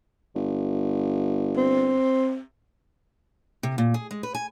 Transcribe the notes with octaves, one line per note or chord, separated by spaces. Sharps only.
G1
C4
C3
A#2
G#4
G#3
B4
G#5